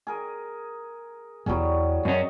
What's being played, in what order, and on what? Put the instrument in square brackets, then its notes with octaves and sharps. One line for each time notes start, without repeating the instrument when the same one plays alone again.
[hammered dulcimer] G#4 A#4
[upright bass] E2 E4 [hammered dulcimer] F#3 G3 G#4
[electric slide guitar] F#2 C#4 [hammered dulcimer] G#4 D#5